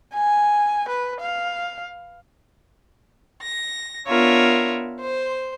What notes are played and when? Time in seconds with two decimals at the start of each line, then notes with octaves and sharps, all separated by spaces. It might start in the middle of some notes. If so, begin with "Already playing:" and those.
0.13 G#5
0.88 B4
1.20 F5
3.42 A#6
4.08 B3 D4 F4 A#4 C#5 E5
4.99 C5